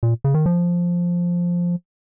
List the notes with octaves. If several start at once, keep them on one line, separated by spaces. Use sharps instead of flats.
A#2
C#3
D#3
F3